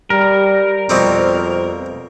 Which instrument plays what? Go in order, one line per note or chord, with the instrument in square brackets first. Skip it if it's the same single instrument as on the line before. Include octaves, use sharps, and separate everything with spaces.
[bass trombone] G3 [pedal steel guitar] A#4 [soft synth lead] D5
[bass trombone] F2 [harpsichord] B2 G3 C4